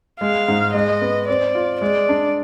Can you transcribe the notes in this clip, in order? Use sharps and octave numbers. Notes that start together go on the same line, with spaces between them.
G#3 F5
G#2
G#3 D#5
B3
C4 D5
F4
G#3 D5
D4